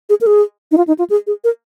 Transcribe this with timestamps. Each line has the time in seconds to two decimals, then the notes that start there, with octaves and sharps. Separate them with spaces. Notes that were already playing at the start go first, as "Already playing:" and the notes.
0.09 G#4
0.21 A#4
0.27 G#4
0.72 D#4
0.77 F4
0.88 D#4
0.99 F4
1.10 G#4
1.27 G#4
1.44 A#4